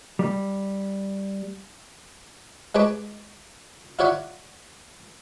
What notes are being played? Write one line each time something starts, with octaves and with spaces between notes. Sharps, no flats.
G3
G#3 B4 C#5 A5 B5 D6
E4 F4 C#5 D5 F#5 B5